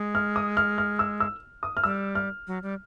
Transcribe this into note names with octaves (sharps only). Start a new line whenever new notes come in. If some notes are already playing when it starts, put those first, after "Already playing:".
Already playing: G#3
F6
D#6
F6
F6
E6
E6
D#6
F6
G3 E6
F6
F#3
G3